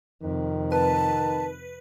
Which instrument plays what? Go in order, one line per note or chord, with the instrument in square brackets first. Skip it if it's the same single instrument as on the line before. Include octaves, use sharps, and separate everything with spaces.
[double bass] F2 C3 [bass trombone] D#3
[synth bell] B4 [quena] A5